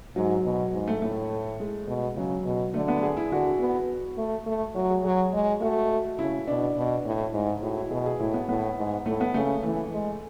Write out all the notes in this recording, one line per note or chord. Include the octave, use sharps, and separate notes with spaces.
G#2 F#3
B2
G#2
A3
A2 A3
G#3
B2
C#3 F#3
B2
D3 A3
B3
G#4
E4
D3 F#4
B3
A3
A3
F#3 F#4
G#4
F#3 G#4
G#3
A3 F#4
C#3 E4
B2 D4
B2
A2
E4
G#2
G#4
A2 F#4
E4
B2 G#4
G#4
A2 E4
B3
A2 B3
G#2
A2 A3
B3
C#3 A3
E3 A3
G#3